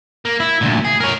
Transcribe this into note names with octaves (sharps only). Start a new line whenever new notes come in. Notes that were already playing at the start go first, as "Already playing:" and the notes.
A#3
E4
D2 A#2
G#4
A#4 C#5